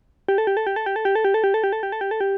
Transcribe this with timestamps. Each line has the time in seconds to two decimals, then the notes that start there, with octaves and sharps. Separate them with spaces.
0.29 G4
0.38 A4
0.47 G4
0.57 A4
0.67 G4
0.76 A4
0.86 G4
0.96 A4
1.05 G4
1.15 A4
1.25 G4
1.34 A4
1.44 G4
1.54 A4
1.64 G4
1.73 A4
1.83 G4
1.92 A4
2.01 G4
2.11 A4
2.21 G4